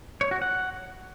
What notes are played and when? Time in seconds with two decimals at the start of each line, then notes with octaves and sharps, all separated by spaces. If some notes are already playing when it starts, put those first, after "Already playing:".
0.21 C#5
0.31 F#4
0.42 F#5